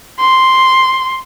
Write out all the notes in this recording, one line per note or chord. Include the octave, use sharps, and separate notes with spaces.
C6